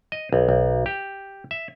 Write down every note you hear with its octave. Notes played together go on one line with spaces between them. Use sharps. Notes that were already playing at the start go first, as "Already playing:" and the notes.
D#5
B1
B1
G4
E5